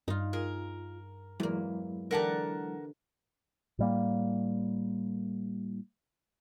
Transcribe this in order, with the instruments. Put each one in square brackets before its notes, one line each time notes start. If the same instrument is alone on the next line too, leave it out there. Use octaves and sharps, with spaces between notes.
[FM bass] G2 [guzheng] D#4 F4
[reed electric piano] F4 [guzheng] G#4 [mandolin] A#4
[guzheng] E2 A#3 [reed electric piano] F#3 G#3 E4
[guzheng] D3 E3 G4 [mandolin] A#4 F#5 A5
[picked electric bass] A2 G3 A#3